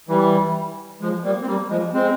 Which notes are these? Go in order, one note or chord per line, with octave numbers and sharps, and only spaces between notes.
E3 G3
F3 G#3
G3 A#3
C4
G3 A#3
F3 G#3
G#3 C4